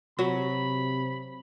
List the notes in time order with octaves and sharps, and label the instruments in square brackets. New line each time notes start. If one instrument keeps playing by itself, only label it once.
[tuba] C3 [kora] F#3 [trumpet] B5